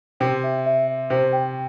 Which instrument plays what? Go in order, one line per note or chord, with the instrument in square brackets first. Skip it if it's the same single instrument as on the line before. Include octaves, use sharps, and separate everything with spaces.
[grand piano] C3 [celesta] G5
[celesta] E5
E5
E5
[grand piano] C3 [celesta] C5
[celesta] G5